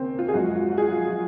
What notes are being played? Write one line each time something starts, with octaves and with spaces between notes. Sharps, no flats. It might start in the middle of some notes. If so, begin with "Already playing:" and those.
Already playing: D#2 C#3 A#3 C4 C#4
F4
G#4
F#2 F3 G#3 F#4
F4
F#4
G#4
F4
F4